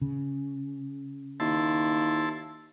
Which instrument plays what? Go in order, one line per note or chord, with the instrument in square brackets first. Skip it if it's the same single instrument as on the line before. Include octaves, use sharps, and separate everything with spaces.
[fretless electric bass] C#3
[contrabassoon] D#2 [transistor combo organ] E4 A5 C6